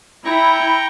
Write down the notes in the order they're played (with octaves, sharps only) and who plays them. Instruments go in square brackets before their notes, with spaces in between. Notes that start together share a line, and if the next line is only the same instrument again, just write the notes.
[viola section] E4 [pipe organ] G5 A#5 C#6